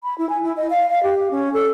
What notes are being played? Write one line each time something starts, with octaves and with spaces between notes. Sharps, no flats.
B5
E4
G#5
E4
D#5
F5
F5
G4
C#4
A4